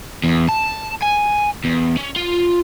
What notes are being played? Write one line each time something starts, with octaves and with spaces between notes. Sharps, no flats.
E2
A5
G#5
E2
C#4
F4